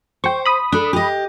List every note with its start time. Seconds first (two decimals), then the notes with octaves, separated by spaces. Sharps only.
0.24 C5 G5 C#6
0.45 B5 D#6
0.72 D4 A4
0.93 G4 D#5